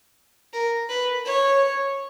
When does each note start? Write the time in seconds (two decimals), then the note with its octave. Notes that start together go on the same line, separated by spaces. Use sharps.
0.53 A#4
0.89 B4
1.26 C#5